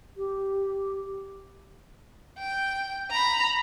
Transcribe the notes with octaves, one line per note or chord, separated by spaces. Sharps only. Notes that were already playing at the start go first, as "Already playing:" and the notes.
G4
G5
A#5 B5